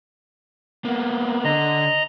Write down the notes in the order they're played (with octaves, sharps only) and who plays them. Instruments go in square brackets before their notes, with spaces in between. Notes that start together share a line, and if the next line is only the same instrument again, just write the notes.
[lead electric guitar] A#3 B3
[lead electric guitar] D3 [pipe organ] D#5 A#5